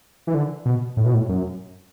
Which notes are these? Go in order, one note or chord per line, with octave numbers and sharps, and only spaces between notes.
E3
D3
B2
A2
B2
A2
F#2